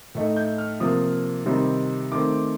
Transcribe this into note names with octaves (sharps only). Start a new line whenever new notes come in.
A2 A3 D#4
G6
F6
C3 F3 A#3 D#6
C3 D#3 G3 C4 D#4
D#3 A3 C4 D6